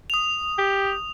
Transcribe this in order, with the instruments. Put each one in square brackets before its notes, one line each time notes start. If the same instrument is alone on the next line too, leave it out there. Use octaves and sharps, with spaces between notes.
[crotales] D#6 F7
[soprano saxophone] G4